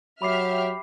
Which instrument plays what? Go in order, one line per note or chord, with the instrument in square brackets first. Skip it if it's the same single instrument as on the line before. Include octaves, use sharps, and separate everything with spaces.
[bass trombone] F#3 [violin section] G4 E5 F6 [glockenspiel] B5 D6 C7